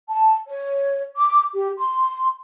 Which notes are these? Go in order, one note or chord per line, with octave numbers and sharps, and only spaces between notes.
A5
C#5
D6
G4
C6